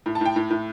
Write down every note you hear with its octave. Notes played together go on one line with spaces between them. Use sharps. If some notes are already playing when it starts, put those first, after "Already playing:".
A2
A5
A2 G5
A2
A2